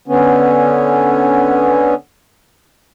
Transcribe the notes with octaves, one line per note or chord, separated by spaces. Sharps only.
D3 B3 C#4